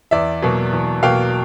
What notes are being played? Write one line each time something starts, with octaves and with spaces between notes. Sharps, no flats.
E2 D5 E5
B2 F#3 A#3
E2
B2 F#3 A#3 F5 G5